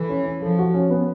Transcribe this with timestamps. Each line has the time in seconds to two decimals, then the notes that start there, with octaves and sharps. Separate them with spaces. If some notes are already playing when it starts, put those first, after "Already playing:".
Already playing: E3 A4
0.09 C#4
0.26 C#4
0.41 F3 A4
0.59 F#4
0.74 C#4
0.90 B3